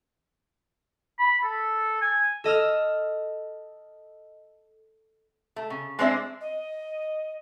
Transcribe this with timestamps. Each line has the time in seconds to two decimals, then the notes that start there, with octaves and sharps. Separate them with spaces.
1.19 B5
1.44 A4
2.02 G#5
2.44 A4 D#5 E6 F6
5.56 A3
5.70 C#3
5.99 G#3 C4 D4 C5 D5 E5
6.40 D#5